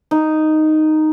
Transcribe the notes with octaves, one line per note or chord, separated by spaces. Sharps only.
D#4